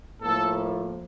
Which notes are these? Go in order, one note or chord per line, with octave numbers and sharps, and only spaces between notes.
A2 F3 A#3 A4